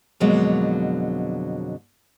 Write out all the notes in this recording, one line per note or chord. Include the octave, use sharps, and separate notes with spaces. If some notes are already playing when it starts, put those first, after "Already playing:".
F2 B2 D3 F#3 G#3 A#3